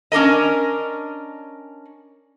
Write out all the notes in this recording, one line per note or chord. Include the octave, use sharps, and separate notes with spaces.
C#4 D4 A#4 D#5